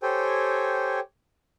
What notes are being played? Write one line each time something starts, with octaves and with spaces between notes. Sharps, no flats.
G4 A4 C5 C#5 G5 G#5